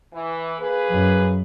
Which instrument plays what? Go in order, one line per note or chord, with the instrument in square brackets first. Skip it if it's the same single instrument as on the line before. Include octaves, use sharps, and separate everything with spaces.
[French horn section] E3
A#3 G#4 B4
[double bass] F#2